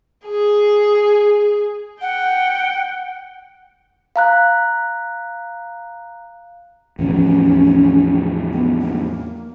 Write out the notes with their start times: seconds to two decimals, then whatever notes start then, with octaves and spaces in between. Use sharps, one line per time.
0.26 G#4
2.01 F#5 G5
4.16 F5 A#5 F#6
6.99 E2 A2 F3 C#4
8.52 B3
8.79 A#3